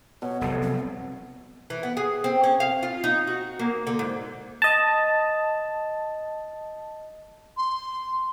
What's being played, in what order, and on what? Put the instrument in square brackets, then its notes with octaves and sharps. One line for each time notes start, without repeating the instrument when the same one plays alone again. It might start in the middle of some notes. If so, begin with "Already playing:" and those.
[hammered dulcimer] B2 [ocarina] C#5
[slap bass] F1 C2 F#3 [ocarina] A4
[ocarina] C4
[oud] E3
B3
G#4
C4
C#4
F5
F4
D#4
F#4
A#3
D3
G#2
[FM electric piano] D#5 A5
[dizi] C6